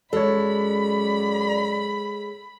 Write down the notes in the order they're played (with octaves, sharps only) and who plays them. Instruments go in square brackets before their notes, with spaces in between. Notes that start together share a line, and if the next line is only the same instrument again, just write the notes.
[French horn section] F#2 D5 [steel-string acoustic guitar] G#3 [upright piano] A4 C#5 [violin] B5